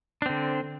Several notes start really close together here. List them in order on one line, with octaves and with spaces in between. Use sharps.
D4 C4 D3